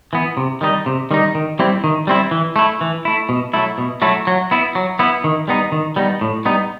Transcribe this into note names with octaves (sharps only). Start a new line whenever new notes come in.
E3 B3
C3
D#3 G3 D#4
C3
D#3 G3 D#4
D#3
G3 C4 E4
D#3
G3 C4 E4
E3
A3 E4
E3
A3 E4
B2
F#3 A3 E4
B2
F#3 A3 E4
F#3
B3 E4
F#3
B3 E4
D#3
G3 B3 D#4
D#3
G3 B3 D#4
A2
G3 B3 D#4